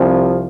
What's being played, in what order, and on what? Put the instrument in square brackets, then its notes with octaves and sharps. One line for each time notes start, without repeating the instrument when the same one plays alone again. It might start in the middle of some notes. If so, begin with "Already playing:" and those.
Already playing: [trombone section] C2 C3 F3